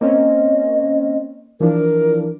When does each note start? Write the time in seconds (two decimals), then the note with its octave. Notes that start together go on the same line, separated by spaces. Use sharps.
0.01 A#3 C4 C#4 D#5
1.60 E3 F3 D4 A#4